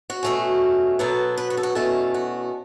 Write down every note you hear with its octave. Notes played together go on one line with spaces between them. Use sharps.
F#4
B2 A3 C#4
B2 F#3 B3 A4
B4
F#4
A4
F#4
E2 B2 A3 C#4 A4
F#4